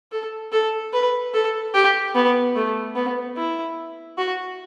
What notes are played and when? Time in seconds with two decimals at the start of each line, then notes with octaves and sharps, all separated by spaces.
0.12 A4
0.52 A4
0.93 B4
1.33 A4
1.74 G4
2.15 B3
2.55 A3
2.95 B3
3.37 E4
4.18 F#4